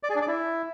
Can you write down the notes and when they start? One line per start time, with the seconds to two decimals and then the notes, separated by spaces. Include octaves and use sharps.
0.03 D5
0.09 G#4
0.16 D4
0.22 D5
0.28 E4